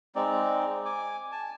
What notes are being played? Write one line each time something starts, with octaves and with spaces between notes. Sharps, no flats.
G#3 C4 D#4 D5
G#5 D6
G#5 A5